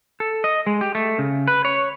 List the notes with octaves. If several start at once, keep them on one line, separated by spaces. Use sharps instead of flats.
A4
D#5
G#3
G4
A3
C#3
B4
C#5